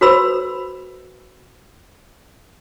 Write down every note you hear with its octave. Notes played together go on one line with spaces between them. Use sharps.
F#4 A4 B4 C5 B5 E6